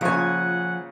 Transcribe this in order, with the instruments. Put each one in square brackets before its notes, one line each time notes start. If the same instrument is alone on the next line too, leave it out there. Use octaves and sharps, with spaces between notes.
[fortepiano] A#2 C#3 C#6 [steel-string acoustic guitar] F3 G#5 [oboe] F#5